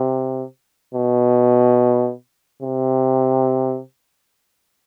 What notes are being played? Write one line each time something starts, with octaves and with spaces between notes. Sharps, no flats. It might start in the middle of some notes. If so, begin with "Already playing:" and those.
Already playing: C3
B2
C3